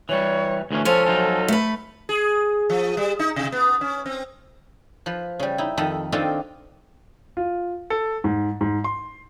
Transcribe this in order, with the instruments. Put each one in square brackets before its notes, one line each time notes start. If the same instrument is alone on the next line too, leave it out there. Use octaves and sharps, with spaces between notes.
[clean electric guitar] E3 G3 [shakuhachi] C#5
[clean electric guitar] D2 E3 C#4
[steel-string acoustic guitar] F3 G#5 [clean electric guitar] C#4 F4 [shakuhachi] A4
[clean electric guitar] F#3 D#4 F4
[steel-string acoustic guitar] A3 B4
[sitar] G#4
F3
G3
D#4
C3
B3
C#4
C4
[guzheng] F3 B4
C#3 G3
D#4 E4
F2 D#3 A4 D#5 A5 B5
D#3 C4 D4 F4 A4 D#5
[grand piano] F4
A4
G#2
G#2
C6